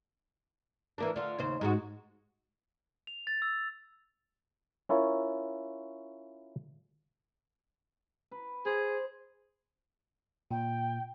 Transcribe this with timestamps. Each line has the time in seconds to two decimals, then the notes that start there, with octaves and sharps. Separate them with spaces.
0.98 E3 A#3 D4
1.16 D3 F4
1.38 D#2 C#3 C5
1.61 G#2 G#3 F#4
3.07 F7
3.27 A6
3.42 E6
4.89 C#4 E4 F4 A#4 C#5
8.31 B4
8.66 G#4 C5
10.51 A#2 G5